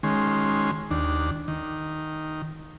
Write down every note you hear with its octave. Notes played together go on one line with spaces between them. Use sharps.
D#3 G#3 C#4 C6
D#2 D4
D#3